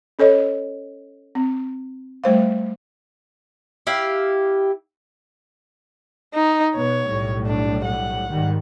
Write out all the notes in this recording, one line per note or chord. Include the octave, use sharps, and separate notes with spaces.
C#4 A4 C#5 D#5
C4
G3 A3 C5 F5
E4 G4 F5
D#4
B2 B3 C#5
B1 A2 G3
D4
F#5
G#2 D#3 G3